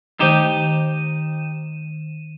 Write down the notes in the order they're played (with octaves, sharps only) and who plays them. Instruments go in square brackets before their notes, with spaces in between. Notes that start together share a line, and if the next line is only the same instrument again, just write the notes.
[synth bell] D#3 D#7 E7 [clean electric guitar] D#4 G4